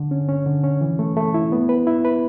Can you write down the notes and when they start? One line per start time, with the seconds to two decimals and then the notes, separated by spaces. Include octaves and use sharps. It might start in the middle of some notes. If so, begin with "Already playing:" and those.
Already playing: D3
0.11 C#4
0.28 C#4
0.46 D3
0.63 C#4
0.81 E3
0.99 A3
1.17 A3
1.34 E4
1.52 B3
1.69 B4
1.87 E4
2.05 B4